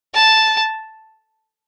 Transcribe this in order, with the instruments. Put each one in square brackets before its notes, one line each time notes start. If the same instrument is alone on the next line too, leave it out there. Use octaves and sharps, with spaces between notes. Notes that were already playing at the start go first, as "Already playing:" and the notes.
[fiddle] A5